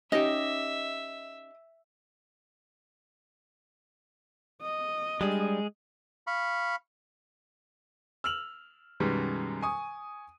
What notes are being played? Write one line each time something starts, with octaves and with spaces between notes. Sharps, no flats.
C#4 D#4 G4 D#5 E5
D#5
G3 G#3 D4 G#4
F5 B5 C#6
E6 F6 F7 F#7
F#2 B2 D#3 G3 G#3
G#5 C#6 D#6